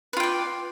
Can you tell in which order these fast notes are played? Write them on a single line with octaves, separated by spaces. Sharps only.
B4 F4 G5 D5